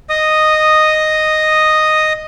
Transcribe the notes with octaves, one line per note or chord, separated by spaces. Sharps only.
D#5 D#6